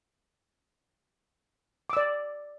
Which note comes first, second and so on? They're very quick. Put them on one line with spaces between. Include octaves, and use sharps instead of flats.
D6 E6 D5